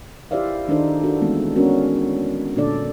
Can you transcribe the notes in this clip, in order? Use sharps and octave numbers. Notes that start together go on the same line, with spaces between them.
E4 G4 C5 D5 E5 F5
D#3 D4 D#4 A4 C5
D4 F#4 A4
E3 G#3 A3 B3 C4 D#4
G#3 B3 C#4 D4 F#4 A#4
A#2 D3 D4 A4 D5